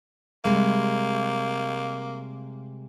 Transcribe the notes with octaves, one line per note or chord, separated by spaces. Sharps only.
C3 G3 G#3 A#3